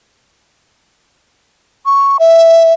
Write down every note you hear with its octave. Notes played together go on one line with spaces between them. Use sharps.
C#6
E5